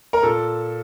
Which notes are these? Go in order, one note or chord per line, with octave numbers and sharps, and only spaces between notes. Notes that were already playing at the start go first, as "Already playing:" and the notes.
A#4
A#2 A4